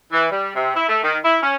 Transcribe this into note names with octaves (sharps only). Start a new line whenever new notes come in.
E3
G3
C3
E4
A3
D#3
E4
C#4